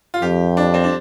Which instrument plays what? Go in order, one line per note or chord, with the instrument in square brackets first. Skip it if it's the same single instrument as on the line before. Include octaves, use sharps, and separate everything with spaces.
[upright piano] F4
[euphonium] F2 [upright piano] G4
[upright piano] D4
C4
D4